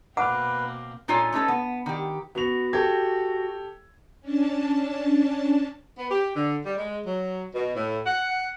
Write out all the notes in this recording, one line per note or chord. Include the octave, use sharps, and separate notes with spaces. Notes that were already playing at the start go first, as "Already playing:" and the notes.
B2 A#3 C4 B4 F#5 D6 F6
A#2 D#4 F4 A4 C#5 G#5
A3 C#4 D#4 A4 B4
B3
D#3 G4
B3 F#4 F7
G4 A4 G#6
C#4 D4 A5
B3
G4
D3
G3
G#3
F#3
B2
A2
F#5